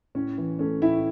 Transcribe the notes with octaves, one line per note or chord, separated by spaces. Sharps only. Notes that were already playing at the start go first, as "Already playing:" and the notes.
A2 C#4
E3
A3 C#4
A2 E4